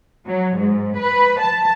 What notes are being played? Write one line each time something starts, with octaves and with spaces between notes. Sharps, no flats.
F#3
G#2
B4
A5